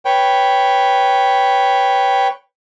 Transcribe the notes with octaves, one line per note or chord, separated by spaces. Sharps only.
B4 C#5 G5